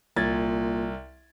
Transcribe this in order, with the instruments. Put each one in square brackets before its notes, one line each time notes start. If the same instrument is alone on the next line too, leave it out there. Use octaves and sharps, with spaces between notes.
[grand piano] C2 G#6 A6 [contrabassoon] A#2